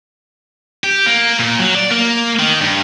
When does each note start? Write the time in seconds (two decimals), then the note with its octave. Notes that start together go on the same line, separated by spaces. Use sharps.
0.84 G4
1.06 A#3
1.39 A#2
1.59 F#3
1.75 D5
1.91 A#3
2.40 D#3
2.61 G2